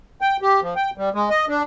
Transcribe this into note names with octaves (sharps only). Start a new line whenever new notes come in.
G5
G4
F3
G5
G3
G#3
D#5
D4